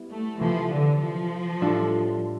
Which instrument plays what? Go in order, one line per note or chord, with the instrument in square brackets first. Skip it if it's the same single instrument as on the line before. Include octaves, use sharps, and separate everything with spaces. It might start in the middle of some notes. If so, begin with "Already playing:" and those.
Already playing: [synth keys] G3 B3 E4
[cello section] A3
[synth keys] C3 E3 A3 [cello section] F3
[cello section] D3
F3
[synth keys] A2 G3 D4 F4 A4